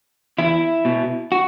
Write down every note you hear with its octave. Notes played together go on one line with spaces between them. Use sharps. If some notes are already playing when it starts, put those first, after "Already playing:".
E2 E4
B2
F#4